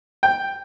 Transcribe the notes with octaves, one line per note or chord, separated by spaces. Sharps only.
G5